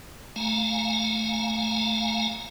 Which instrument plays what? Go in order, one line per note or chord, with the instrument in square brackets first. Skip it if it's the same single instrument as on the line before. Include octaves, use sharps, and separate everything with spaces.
[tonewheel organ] A3 F5 G#5 A#5